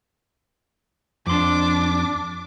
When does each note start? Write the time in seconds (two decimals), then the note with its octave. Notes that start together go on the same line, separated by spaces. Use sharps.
1.27 F2 D4 C6 D6